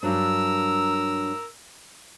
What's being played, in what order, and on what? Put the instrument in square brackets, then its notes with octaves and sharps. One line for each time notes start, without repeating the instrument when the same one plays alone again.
[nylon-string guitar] G2 F#3 D4 [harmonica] A#4 E6